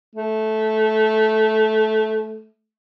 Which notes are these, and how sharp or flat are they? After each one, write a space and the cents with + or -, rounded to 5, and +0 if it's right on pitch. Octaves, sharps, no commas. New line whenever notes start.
A3 -15